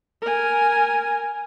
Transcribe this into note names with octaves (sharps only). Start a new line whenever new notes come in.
A#4 G#5